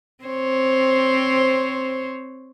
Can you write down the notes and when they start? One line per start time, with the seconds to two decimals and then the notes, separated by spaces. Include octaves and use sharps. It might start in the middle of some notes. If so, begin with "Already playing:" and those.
0.24 C4 C5 C#5